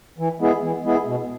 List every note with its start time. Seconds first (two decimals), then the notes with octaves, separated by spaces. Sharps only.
0.19 E3
0.40 G#3 B3 E4 G#4
0.62 E3
0.84 G#3 B3 E4 G#4
1.06 B2